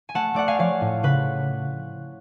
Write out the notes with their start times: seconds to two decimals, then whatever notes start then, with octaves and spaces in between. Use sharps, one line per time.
0.09 G#5
0.14 A3 F#5 A5
0.34 A3 D5 F#5
0.48 F5 G#5
0.59 F3 C#5 F5
0.81 A2
1.03 C#3 B4